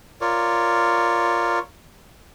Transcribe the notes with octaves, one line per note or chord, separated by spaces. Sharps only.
F4 A#4 C#5 D5